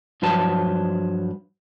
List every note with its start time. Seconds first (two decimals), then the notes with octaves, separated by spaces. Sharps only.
0.22 G2 F3 F#3 B4 A5